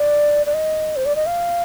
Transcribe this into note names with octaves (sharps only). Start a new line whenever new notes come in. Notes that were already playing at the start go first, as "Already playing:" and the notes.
Already playing: D5
D5
D#5
C5
D5
D#5
F5